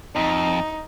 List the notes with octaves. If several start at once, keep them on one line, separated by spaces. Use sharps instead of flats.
F2 D#4